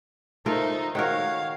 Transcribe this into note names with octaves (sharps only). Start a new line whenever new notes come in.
A3 D#4 F4 A#4 C5
D#3 F#4 A#4 C#5 F5